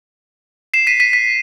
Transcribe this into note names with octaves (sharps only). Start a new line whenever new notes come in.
C7 E7
B6 D#7
B6 D#7
B6